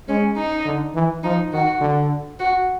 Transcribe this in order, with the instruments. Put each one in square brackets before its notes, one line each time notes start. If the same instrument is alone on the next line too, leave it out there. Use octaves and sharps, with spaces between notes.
[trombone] G#3 [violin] C#4
[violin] D#4
[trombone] D3
E3
[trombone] F3 [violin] D#4
[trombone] D#3 [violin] F#4
[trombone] D3
[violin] F#4